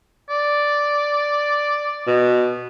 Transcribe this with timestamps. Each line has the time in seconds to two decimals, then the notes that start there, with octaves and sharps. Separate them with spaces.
0.30 D5
2.07 B2